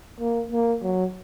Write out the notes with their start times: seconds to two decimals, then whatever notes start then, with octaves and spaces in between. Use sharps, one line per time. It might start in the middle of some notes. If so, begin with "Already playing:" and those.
0.20 A#3
0.52 A#3
0.83 F#3